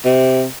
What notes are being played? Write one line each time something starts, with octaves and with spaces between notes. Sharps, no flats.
C3